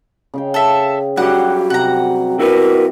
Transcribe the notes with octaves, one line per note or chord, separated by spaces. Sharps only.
C#3 F5 G5
A4 E5
F#2 G3 F#4 G4 F#5
C3 F#5 A#5
E4 F#4 A#4 B4